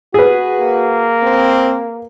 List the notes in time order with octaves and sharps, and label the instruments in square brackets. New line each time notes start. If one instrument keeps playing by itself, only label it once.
[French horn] F#4 [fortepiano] G#4 B4
[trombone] A#3
[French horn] C4